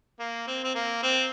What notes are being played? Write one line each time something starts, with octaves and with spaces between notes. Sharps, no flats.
A#3
C4
C4
A#3
C4